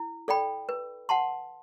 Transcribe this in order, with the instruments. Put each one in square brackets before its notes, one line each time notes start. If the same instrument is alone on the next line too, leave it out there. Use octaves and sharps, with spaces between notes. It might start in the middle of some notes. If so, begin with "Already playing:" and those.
Already playing: [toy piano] E4
A4 D5 G5 B5
B4
F#5 A5 C6